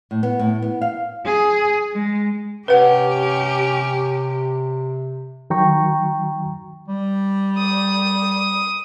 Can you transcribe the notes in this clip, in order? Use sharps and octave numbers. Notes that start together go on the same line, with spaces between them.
A2
B3
A2
B3
F5
G#4
G#3
C3 C#4 G4 B4 F#5
D#3 F#3 G5 A#5 C#6
G3
D#6